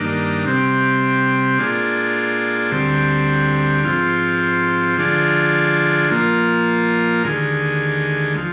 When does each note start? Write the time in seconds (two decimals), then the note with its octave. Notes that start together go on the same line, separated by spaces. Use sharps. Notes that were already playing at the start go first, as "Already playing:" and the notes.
Already playing: G2 D#3 A#3 D4
0.46 C3 G3 C4
1.59 A#2 G#3 D4 F4
2.71 D2 D3 G3 C4
3.84 G#2 F3 C4 F4
4.97 D3 F3 G#3 D4 F4
6.10 A#2 F3 A#3 F4
7.23 D#2 D3 G#3
8.37 F3